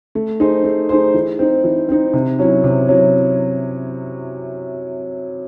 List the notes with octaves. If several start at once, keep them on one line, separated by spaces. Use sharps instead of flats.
A3
D#4 G#4 C5
A3
D#4 G#4 C5
E3
C4 D#4
E3
C4 D#4
C3
F#3 C#4 E4
C3
F#3 C#4 E4